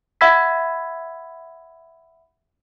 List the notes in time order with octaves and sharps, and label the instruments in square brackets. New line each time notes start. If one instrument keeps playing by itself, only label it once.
[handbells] E5 F#5 B5 E6 G#6 B6